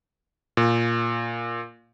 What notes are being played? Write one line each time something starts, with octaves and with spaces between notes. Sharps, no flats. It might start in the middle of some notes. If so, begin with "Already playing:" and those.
A#2